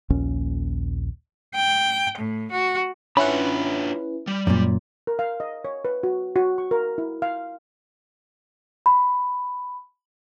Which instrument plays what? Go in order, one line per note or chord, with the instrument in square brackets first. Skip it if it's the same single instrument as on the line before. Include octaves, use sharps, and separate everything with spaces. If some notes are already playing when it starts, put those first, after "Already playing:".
[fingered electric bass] A#1 D#2 A#2 C#4
[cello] G5
A2
F#4
[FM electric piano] C#4 E4 B4 [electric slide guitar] D4 F4 F#5 [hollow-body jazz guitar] B5
[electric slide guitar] G3
[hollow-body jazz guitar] F#2 A#2
[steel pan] A#4
F5
D#5
C#5
B4
F#4
F#4
C#6
A#4
E4
F5
[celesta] B5